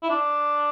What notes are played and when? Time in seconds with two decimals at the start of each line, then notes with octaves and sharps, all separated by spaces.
0.03 E4
0.10 D4